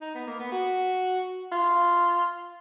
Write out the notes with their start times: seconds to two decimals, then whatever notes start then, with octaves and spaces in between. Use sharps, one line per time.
0.01 D#4
0.15 B3
0.27 A#3
0.40 B3
0.52 F#4
1.52 F4